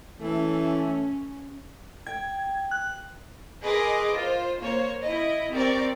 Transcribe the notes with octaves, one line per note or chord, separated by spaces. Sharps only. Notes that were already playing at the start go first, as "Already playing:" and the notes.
E3 A3 C#4
G5 G#6
F#6
G#4 A#4 B4 D#5 C6 D6
F4 C5
A#3 C5 C#5
E4 D#5
C4 G4 A#4 D5 C#6